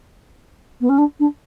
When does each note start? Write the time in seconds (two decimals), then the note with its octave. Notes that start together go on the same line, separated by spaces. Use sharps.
0.80 B3
0.89 C#4
0.98 D4
1.19 D4